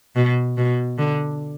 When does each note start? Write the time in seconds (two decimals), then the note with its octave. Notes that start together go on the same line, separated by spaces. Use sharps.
0.16 B2
0.57 B2
0.98 D3